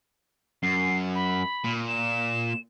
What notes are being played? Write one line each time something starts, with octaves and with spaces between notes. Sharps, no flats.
F#2 C7
B5
A#2
E7